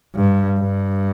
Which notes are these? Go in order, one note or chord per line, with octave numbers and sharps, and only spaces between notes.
G2
G2